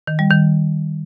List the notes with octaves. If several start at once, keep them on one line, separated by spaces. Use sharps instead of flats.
D#3
G3
D#3